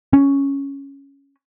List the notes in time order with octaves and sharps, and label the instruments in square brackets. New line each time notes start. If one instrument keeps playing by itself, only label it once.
[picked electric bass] C#4